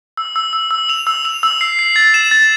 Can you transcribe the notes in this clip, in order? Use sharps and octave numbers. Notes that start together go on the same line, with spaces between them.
E6
E6
E6
E6
F7
E6
F7
E6
C7
C7
A6
E7
A6